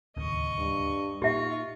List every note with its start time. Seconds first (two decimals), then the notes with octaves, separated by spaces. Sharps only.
0.17 D1 D#2 C#3 D#5 C#6
0.58 G2
1.22 A#2 D#4 F4 G4 E5 C#6